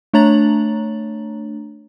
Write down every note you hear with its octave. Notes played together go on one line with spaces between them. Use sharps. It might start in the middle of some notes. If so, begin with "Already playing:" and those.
A3 D4 C#5 A#5 A6 F#7